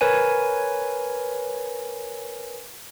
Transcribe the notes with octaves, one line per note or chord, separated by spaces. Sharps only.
A#4 B4 C#5 G#5